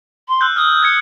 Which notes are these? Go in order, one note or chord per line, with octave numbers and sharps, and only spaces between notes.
C6
E6 F#6 G6
D#6 F6
G6 G#6 C#7